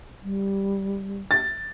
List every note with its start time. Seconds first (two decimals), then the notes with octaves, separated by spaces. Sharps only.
0.23 G3
1.31 A6